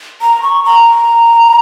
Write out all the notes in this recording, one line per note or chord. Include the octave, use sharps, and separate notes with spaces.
A#5
C#6
A#5